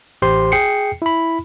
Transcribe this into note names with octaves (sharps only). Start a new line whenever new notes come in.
A1 G4 C5 C6
G#4 G5 C7 C#7
E4 B5